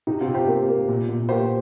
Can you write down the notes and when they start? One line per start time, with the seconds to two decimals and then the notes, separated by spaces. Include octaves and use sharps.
0.07 C3 D#4
0.21 C4 F4
0.27 C3
0.34 G4 C5
0.48 A#3
0.68 A#3
0.88 A#2
1.09 A#2
1.29 A#3 G4 C5